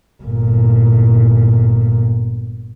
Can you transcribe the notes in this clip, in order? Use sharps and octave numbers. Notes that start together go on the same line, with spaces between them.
G1 A#2